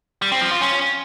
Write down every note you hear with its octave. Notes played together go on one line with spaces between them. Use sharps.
G3
C4
F3
F4
C#4